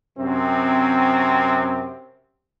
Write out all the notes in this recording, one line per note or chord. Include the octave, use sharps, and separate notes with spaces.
F#2 C3 C4